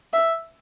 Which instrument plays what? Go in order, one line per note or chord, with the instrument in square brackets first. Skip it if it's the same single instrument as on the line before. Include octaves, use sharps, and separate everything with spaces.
[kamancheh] E5